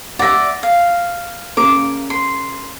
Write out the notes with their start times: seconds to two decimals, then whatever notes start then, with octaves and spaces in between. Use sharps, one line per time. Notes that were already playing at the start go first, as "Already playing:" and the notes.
0.19 D5 E5 F#5 A#6
0.63 F5
1.57 C#3 A#3 D6
2.10 C6